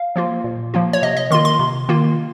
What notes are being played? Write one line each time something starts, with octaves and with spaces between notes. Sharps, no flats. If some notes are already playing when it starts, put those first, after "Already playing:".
Already playing: F5
F3 A#3 F4
A#2
F3 A#3 F4
C#5
C3 D#5
D#5
D#3 A#3 F4 C6
C6
C3
D#3 A#3 F4